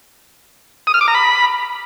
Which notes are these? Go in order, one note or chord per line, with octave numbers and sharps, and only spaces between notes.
D#6
F6
D6
A#5
B5